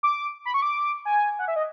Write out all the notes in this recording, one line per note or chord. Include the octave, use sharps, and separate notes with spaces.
D6
B5
C#6
D6
G#5
F#5
E5
D#5